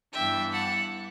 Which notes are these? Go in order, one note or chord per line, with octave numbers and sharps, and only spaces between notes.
G2 E3 B3 D4 E5 G5
F#5 A5